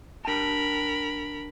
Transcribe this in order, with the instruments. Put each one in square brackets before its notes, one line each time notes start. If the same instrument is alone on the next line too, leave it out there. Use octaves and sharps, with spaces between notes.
[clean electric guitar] D4 G5 A5 [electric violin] A#4 B5